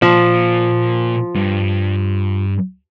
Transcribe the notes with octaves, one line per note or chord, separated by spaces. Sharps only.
A#2 F3
G2